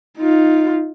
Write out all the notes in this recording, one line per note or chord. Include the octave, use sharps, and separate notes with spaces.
D#4 F4